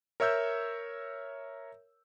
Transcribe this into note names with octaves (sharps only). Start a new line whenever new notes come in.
A#4 C#5 E5 E6 G6